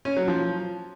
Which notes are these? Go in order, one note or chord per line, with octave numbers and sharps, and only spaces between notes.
C#4
F#3
F3